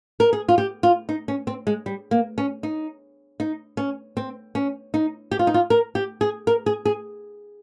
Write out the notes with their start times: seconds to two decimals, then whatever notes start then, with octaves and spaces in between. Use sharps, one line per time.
0.20 A#4
0.33 G#4
0.48 F4
0.58 G4
0.83 F4
1.09 D#4
1.28 C#4
1.47 C4
1.67 G#3
1.86 G3
2.11 A#3
2.38 C#4
2.63 D#4
3.40 D#4
3.77 C#4
4.17 C4
4.55 C#4
4.94 D#4
5.31 G4
5.39 F4
5.47 D#4
5.54 F4
5.70 A#4
5.95 G4
6.21 G#4
6.47 A#4
6.66 G#4
6.85 G#4